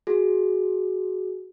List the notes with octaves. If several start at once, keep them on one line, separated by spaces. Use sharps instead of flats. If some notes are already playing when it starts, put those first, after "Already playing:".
F#4 G#4